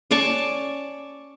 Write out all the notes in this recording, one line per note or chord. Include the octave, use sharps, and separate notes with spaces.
C#4 D5 A5 C#6